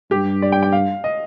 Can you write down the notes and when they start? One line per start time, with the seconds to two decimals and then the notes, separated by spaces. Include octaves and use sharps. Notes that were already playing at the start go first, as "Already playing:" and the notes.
0.11 G2 G4
0.42 D5
0.52 G5
0.62 G5
0.73 F5
1.04 D#5